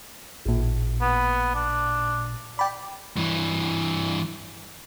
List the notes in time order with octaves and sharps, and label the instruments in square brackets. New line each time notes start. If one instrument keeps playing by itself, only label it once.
[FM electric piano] A1 A#2
[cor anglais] B3
D4
[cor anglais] D5 [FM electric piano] G5 B5
[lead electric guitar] G2 E3